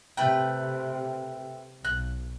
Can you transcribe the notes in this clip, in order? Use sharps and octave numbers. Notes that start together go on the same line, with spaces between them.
C3 A3 B4 G5
B1 F#6